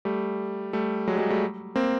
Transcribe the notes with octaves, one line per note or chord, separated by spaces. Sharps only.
G3 A3
G3 A3
F#3 G#3
G3
F#3 G#3
G3 A3
A#3 C4